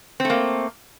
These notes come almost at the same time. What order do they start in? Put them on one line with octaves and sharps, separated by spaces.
C4 A3 A#3